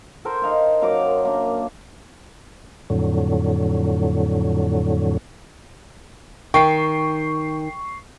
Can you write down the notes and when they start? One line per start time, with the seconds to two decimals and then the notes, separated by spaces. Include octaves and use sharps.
0.25 A4 A#4 C5
0.42 D#4 F5 G#5
0.82 F#2 F5 A#5 D6
1.25 A#3 D4
2.90 F2 A2 D3 F#3
6.54 D#3 G5 C#6 C7